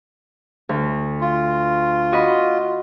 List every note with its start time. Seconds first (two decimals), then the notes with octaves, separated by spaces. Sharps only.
0.69 D2
1.21 F4
2.12 F#4 D#5 B5